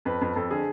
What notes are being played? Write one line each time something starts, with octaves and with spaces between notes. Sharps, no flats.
F2 B4
F2
F2 A4
D3 G#4